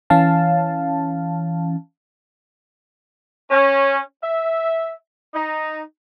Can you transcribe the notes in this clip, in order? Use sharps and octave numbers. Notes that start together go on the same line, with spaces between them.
E3 C#4 F5 A5
C#4
E5
D#4